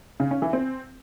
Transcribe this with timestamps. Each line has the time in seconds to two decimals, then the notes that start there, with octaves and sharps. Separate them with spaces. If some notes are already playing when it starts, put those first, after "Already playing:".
0.20 C#3
0.31 C#4
0.42 E3
0.53 C4